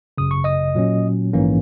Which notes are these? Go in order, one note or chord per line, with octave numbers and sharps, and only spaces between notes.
G#1 F#2 C#3 D#6
C#6
D#5 D#6
A#2 F#3 C#4
A#1 G#2 E3 A#3 C#4